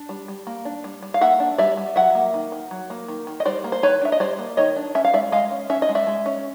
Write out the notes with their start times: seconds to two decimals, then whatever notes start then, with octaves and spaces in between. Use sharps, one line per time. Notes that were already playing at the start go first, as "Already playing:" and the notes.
Already playing: D4
0.09 G3
0.28 G3
0.47 A#3
0.65 D4
0.84 G3
1.02 G3
1.14 F5
1.21 A#3 E5 F#5
1.40 D4
1.58 G3 D5 E5
1.77 G3
1.96 F#3 E5 F#5
2.15 A#3
2.34 D#3
2.52 D#3
2.71 F#3
2.90 A#3
3.08 D#3
3.27 D#3
3.40 D#5
3.45 G3 C5 D5
3.64 A#3
3.72 C5
3.83 D#3 B4 C#5
4.02 D4 E5
4.12 D#5
4.20 G3 C5 D5
4.39 A#3
4.57 D#3 C#5 D#5
4.76 D4
4.95 C#4 E5
5.05 F5
5.13 G#3 D5 E5
5.32 G#3 D#5 F5
5.51 C#4
5.70 C#4 E5
5.82 D#5
5.89 G#3
5.95 D5 E5
6.07 G#3
6.26 C#4